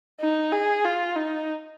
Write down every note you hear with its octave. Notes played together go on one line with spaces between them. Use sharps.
D#4
G#4
F4
D#4